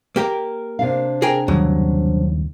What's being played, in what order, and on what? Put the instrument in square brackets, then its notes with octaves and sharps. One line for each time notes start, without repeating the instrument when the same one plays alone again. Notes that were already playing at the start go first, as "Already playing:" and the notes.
[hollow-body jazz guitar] A#3 G4 A#4
[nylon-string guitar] C3 D4 F5
[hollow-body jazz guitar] G#4 A#4 G5
[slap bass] D#2 C#3 G3 [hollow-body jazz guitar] F#3